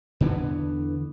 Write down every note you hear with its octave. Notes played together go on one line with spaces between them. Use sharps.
E2 D3 E3 B3